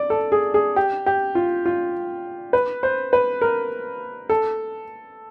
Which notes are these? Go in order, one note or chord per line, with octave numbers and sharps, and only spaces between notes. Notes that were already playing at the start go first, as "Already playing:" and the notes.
Already playing: D5
A4
G#4
G#4
G4
G4
F4
F4
B4
C5
B4
A#4
A4